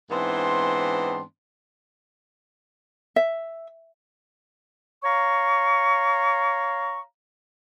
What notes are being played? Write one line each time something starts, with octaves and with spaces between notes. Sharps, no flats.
G#2 E3 B3 C4 D4 C6
E5
C#5 F5 A#5 C#6